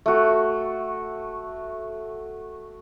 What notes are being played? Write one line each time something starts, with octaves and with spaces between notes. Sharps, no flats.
A3 F#4